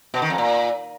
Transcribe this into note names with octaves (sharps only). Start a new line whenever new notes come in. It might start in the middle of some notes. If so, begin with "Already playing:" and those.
B2
D#3
F2
A#2